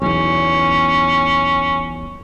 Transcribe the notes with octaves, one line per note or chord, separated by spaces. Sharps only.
B1 E2 C#4